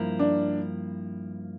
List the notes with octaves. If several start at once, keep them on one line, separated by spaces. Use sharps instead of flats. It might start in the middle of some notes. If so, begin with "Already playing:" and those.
Already playing: G2 F3 A#3 E4 A#4
D4